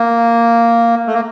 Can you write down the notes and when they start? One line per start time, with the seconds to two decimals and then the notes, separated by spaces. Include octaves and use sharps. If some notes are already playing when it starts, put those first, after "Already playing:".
Already playing: A#3
1.07 A3
1.14 A#3